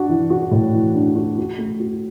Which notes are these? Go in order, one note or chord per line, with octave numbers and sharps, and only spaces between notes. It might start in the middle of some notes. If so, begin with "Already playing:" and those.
Already playing: D4 F#4
E3
F#4
A2
E3
D4
F#4
F#4
A3
F#4